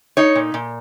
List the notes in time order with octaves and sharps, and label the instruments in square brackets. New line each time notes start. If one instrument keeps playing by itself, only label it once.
[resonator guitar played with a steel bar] D#4 C#5
A#2
A#2